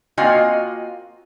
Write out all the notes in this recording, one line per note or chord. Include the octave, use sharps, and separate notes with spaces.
A#3 C4 F4 F#4 D#5 G#5